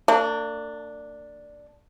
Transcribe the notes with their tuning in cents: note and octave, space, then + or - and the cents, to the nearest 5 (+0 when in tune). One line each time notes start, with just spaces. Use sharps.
A#3 -45 D4 +0